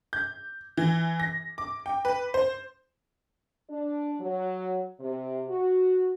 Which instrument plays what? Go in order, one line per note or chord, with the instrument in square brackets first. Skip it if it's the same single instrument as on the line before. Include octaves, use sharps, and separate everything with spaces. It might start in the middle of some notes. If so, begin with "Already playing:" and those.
[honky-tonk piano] G6
E3
A#6
D6
G5
B4
C5
[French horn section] D4
F#3
C3
F#4